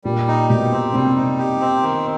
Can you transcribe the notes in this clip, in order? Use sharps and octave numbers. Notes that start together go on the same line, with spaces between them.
A#2 G3
D#4
B2 G4
C4
C3 G3
D#4
G4
C4
D#3